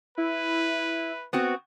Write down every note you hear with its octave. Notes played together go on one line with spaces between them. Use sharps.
E4 B4
B3 C4 F#4